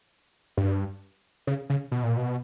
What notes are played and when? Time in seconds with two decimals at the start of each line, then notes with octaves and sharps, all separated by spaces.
0.57 G2
1.47 C#3
1.70 C#3
1.92 B2
2.04 A#2
2.17 B2